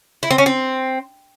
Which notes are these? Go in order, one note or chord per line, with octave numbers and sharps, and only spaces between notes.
E4
C4
C#4
C4